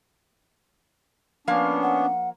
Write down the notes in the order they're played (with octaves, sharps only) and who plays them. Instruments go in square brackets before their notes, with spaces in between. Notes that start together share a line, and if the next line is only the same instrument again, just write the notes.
[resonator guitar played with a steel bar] F3 A#3 F5 [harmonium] B3 C#4 D4
[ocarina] F#5